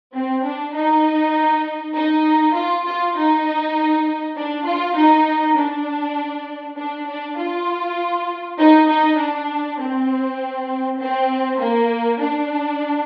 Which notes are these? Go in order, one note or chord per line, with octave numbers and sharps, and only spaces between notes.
C4
D4
D#4
D#4
F4
F4
D#4
D4
F4
D#4
D4
D4
D4
F4
D#4
D#4
D4
C4
C4
A#3
D4